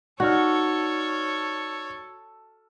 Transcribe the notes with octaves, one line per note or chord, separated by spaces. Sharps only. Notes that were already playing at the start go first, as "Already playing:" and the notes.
D#4 F#4 A4 C#5 D5 F6